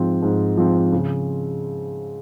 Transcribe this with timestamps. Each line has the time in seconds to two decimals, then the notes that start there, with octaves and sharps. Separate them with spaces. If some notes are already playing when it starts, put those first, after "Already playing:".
Already playing: G#2 F3 C4
0.23 G#2
0.57 F3 C4
0.92 C#3